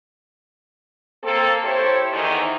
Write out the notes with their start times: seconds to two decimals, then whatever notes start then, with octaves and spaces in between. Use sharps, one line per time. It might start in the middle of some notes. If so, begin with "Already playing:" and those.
1.23 A#3 C4 A4
1.64 E4 G4 A4 C5 C#5
2.12 E2 D#3 E3